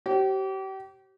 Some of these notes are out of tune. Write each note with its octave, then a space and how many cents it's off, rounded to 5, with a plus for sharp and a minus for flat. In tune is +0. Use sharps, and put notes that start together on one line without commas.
G4 -35 C5 +45